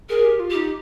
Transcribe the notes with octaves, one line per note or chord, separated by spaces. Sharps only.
G#4 A#4
G4
F4
D#4 G4